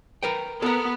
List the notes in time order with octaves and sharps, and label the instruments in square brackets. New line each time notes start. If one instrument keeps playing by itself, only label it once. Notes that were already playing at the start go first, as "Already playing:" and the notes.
[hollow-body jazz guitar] A#4 B4 G5
[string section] B3 [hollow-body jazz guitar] A4 A#4